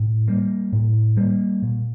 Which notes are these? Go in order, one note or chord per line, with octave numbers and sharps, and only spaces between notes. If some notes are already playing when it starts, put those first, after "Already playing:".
Already playing: A2
G3 A#3
A2
G3 A#3
A#2